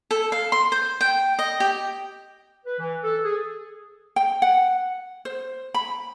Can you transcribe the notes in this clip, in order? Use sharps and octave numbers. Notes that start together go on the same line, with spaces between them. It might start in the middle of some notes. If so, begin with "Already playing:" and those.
A4
F5
C6
C5
G5
D#5
G4
B4
E3
A4
G#4
G5
F#5
C5
B5